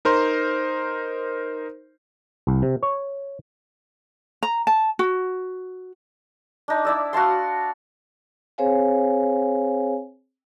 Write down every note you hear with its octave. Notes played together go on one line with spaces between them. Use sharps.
D#4 A#4 C5 C6
C2
C3
C#5
A#5
A5
F#4
D4 D#4
E4 D5 E6
F#4 F5 A5 C6
C4 G#4 C5 C#5 F5 G#5